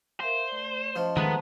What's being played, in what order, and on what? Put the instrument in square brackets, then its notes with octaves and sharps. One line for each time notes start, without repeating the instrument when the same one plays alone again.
[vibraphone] A#4 E5 F5 [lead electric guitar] C5
[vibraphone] A3 D5
[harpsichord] F3 [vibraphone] C#4 D#5 A5
[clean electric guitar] D#3 G#3 A3 [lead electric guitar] B3 [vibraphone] B4 A5 A#5